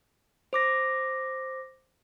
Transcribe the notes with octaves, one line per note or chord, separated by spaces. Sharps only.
C5 D6 A#6